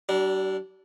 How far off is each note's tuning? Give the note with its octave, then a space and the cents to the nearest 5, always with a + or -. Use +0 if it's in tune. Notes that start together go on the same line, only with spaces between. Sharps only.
G3 -45 D4 -5